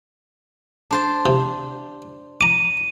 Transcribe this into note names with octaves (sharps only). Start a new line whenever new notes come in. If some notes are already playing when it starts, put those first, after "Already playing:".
D4 C5 A5
C3
A#5 D6 D#7